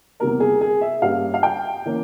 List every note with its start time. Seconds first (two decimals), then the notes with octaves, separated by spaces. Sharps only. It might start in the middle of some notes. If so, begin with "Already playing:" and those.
0.20 E2 C3 G3 A#3 A#4
0.40 G#4
0.61 G#4
0.81 E5
1.02 G2 G3 A#3 C#4 F5
1.34 F5
1.43 G5
1.85 E3 A#3 C#4